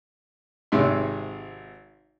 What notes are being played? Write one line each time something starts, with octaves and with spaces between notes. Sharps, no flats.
G#1 G#2 C3 E5 C6